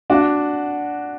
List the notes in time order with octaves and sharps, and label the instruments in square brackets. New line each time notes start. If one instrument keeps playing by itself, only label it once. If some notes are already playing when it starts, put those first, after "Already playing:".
[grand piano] D4 F#4